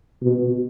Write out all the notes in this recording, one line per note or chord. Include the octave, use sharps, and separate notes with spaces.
B2